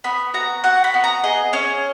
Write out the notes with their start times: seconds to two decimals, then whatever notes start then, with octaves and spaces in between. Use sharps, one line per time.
0.04 B3 B5
0.34 F#4 A#5
0.64 F#4 F#5
0.84 B5
0.94 B3
1.04 A#5
1.24 G#4 D#5
1.53 C#4 C#5